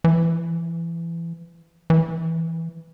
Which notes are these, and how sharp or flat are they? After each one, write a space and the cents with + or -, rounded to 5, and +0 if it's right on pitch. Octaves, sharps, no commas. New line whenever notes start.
E3 +25
E3 +0